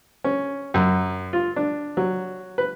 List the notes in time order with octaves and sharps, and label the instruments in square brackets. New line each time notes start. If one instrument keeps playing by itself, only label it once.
[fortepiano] C#4
F#2
F4
D4
F#3
B4